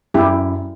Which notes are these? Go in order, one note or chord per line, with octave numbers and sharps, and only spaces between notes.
F#2 E4 G4